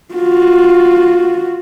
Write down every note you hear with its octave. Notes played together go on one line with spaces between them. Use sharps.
F4 F#4